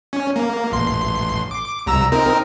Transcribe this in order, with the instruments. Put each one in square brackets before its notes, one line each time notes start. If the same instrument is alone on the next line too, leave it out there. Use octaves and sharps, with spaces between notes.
[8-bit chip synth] C#4
A#3
A1 C6
D6
C2 A#5 E6
C4 D#4 A#4